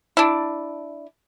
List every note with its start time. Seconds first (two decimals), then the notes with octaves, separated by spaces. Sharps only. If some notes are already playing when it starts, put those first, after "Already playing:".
0.17 D4 E4